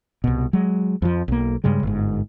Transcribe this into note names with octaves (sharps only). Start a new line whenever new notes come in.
C2 B2
F#3 G#3
F2 F3
B1 A#3
G2 C#3 G3 G#3
G1 G#2